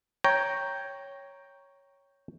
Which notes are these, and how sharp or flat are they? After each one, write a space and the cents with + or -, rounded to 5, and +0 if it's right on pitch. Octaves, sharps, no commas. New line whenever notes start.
C#5 +0 G5 +0 A#5 +0